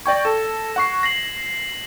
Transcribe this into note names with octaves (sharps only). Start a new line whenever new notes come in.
D5 G5 C#6 G#6 A#6
A4 E7
F#5 C#6 C7
A#6 C7 F#7